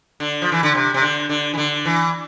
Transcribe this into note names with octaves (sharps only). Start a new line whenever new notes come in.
D3
F3
E3
D3
C3
C3
D3
D3
E3
D3
E3